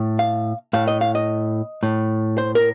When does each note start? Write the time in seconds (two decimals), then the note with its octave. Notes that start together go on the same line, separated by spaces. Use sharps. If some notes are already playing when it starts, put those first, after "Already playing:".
Already playing: A2
0.19 F5
0.73 A2 F5
0.88 D#5
1.01 F5
1.15 D#5
1.83 A2
2.38 C5
2.55 A#4